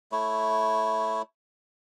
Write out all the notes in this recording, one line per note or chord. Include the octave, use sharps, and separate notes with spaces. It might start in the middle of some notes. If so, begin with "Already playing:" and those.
A3 E4 C#5